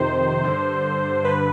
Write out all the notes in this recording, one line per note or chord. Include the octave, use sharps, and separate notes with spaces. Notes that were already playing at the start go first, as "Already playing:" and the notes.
Already playing: F2 C3 D#3 C5
G2 D3
G2 D3 B4